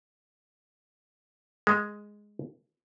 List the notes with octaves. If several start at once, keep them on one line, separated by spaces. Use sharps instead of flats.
G#3